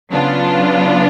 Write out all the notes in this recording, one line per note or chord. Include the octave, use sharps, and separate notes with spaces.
C#3 F#3 B3 D4 F4